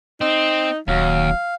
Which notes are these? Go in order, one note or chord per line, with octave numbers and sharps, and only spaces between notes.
C4 D#4
D#1 D#2 F#3 F5